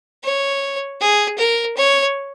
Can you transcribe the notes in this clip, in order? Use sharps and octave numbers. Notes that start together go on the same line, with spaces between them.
C#5
G#4
A#4
C#5